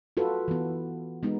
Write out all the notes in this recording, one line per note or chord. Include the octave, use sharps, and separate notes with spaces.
F4 F#4 A4 B4
E3 B3
G#3 B3 D#4